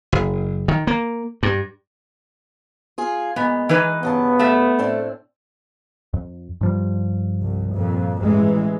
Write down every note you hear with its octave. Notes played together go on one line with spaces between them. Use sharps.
F#1
D#3
A#3
G2
F4 G#4
A#2 G#3 B3
E3 D#4 B4
G2 C#3 B3 A5
A3 E5
A2 C4 D4
F2
G2 F3 G3
C2
F2 A#2
A1 E3 G#3